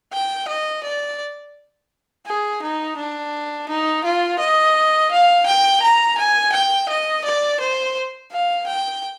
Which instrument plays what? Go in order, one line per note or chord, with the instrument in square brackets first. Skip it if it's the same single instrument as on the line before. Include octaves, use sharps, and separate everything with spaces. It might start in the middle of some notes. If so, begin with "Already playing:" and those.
[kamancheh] G5
D#5
D5
G#4
D#4
D4
D#4
F4
D#5
F5
G5
A#5
G#5
G5
D#5
D5
C5
F5
G5